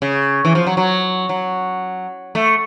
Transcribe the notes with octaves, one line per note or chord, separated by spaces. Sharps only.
C#3
E3
F3
F#3
F#3
F#3
A3